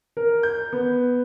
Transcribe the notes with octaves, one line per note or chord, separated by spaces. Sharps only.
A#4
G6
B3